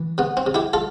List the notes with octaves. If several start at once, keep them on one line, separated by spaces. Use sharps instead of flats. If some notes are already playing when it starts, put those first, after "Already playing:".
Already playing: E3
C3 B3
C4
C3
E4 G4
F4 A4